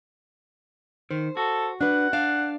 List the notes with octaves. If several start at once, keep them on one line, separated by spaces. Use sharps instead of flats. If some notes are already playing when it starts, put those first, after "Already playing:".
D#3 C5
F#4 A4
D4 B4 F#5
D4 F5